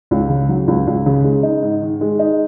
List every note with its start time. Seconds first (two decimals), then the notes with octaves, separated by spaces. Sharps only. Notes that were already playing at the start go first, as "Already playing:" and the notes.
0.11 C#2
0.29 C#3
0.49 F#3
0.68 C#2
0.87 C#2
1.06 C#3
1.24 G#3
1.43 D#4
1.62 G#2
1.81 D#3
2.01 G#3
2.19 D#4